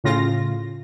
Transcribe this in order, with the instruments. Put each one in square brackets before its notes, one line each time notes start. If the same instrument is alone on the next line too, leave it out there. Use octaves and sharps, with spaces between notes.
[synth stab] A2 C#3 F4 A#6